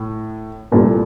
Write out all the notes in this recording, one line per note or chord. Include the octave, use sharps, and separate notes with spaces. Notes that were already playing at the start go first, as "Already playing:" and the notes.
Already playing: A2
C2 A#2 A3